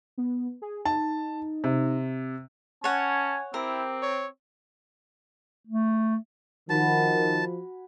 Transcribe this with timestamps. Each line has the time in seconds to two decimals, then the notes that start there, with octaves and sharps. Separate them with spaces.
0.18 B3
0.62 G#4
0.85 D#4 A5
1.64 C3
2.84 C#4 C#5 F#5 G#5 A5
3.54 C4 E4 G4 A#4
4.02 C#5
5.67 A3
6.70 D#3 F3 F#4 G#5 A5 B5